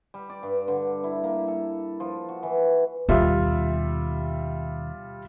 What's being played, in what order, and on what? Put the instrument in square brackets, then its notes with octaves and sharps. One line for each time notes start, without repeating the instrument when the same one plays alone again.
[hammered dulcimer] G3
D5
G2
D3
E4
A#3
A4
F3
F#4
E3
[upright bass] D#2 B2 [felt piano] G3 F4 E5